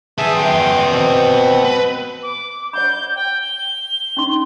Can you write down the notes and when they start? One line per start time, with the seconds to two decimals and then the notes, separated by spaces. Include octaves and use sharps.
0.18 B3 G#4 E5 G#5 A5
0.36 F#2 G5 C6
0.91 B2 C4
1.65 B4
2.23 D6
2.73 C#5 F#5 B5 G6
3.15 G5
3.42 G7
4.17 C#4 D#4 C6